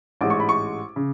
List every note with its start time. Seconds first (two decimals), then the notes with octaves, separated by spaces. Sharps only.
0.21 A1 G#2 G#3 D6
0.30 C#6
0.40 B5
0.49 C#6
0.96 C#3